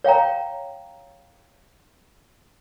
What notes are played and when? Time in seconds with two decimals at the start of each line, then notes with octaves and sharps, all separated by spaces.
0.04 C#5 F5 G5 A#5